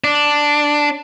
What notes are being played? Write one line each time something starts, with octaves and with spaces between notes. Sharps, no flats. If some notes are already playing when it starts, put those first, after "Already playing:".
D4